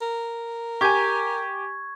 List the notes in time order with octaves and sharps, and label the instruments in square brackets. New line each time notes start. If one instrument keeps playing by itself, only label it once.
[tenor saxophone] A#4
[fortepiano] G4 G#5 [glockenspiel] C#6 G#6